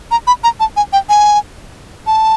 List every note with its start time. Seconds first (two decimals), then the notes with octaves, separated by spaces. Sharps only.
0.11 A#5
0.27 B5
0.44 A#5
0.60 A5
0.77 G#5
0.93 G5
1.09 G#5
2.07 A5